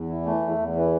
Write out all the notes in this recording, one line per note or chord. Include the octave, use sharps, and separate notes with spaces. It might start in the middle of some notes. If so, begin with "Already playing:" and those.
Already playing: E2
E3
A3
E2
E2
E3